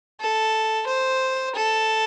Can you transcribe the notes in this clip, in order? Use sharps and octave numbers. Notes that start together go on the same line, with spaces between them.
A4
C5
A4